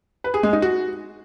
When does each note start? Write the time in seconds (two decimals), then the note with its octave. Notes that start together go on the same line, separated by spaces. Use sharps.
0.24 B4
0.34 G#4
0.43 G#3
0.53 D#4
0.62 F#4